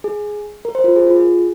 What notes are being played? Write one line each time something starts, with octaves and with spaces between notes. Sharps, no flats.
G#4
A#4
C5
F4 A#4
G#4
F4
G#4